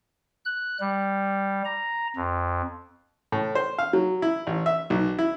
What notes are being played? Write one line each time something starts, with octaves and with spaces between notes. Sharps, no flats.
F#6
G3
A#5
F2
A2
C5
F5
F#3
E4
A1
E5
B1
E4